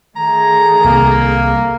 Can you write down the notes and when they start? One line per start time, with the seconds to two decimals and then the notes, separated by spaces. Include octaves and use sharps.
0.16 D#3 A3 G#4 A#5
0.84 C2 A#3